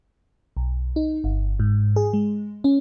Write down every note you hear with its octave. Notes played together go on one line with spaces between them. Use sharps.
B1
D#4
G1
G#2
G#4
G#3
C#4